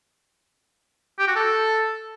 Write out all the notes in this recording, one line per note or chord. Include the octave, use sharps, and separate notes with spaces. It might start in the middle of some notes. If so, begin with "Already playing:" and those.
G4
F#4
A4